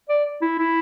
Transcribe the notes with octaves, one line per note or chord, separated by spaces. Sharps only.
D5
E4
E4